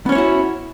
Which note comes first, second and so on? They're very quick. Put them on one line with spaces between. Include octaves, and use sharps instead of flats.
B3 C#4 C#5 E4 F#4